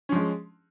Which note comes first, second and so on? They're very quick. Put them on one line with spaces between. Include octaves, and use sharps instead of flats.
C#4 F3 G#3